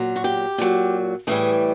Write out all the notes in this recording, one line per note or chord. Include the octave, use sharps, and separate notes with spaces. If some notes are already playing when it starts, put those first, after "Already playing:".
Already playing: A#2 F#3
F#4
G4
A#2 F#3
A2 E3 G3 G#4